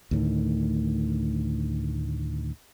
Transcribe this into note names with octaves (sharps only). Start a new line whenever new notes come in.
D2 A2 D#3